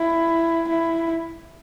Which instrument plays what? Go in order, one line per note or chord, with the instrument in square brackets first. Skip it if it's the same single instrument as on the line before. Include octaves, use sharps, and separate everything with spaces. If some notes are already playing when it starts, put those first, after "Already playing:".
Already playing: [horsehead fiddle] E4
E4